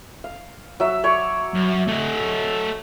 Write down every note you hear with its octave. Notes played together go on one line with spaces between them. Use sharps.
F5
F#3 E5
C#5 D5 C#6
F#2
A3 D#5